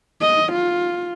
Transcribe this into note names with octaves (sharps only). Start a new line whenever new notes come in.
D#5
F4